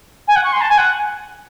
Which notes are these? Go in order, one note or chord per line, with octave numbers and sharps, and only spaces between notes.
G#5
F#5
C#6
C6
A5
G#5
F#5